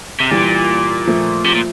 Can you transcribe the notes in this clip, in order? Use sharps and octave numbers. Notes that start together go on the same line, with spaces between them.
C3
A#2 E3 G3
F3 A3
C3
A#2